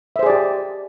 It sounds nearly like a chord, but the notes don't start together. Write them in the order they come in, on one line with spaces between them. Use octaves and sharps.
E5 C5 G#4 D5 G4